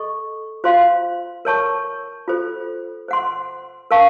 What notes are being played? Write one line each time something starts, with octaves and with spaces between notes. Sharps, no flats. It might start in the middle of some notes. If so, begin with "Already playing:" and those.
Already playing: A4 D#5 C#6
F4 C5 F5 C6
A#4 C#5 A5 C#6
F4 A4 C5
C5 F#5 C6
A#4 F5 A5 C#6